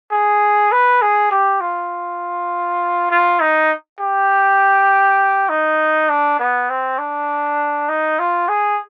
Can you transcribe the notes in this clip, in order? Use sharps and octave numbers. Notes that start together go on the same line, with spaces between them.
G#4
B4
G#4
G4
F4
F4
D#4
G4
D#4
D4
B3
C4
D4
D#4
F4
G#4